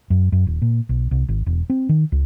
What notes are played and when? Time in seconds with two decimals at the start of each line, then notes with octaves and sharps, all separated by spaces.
0.10 F#2
0.32 F#2
0.47 D#1
0.62 A#2
0.89 B1
1.11 C2
1.29 G#1
1.46 E1
1.70 C4
1.89 D#3
2.12 C#2